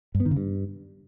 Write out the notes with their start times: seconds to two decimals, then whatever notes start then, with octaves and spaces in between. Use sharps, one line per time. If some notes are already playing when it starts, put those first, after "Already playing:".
0.15 G2
0.20 B3
0.26 D#3
0.31 C#3
0.37 G2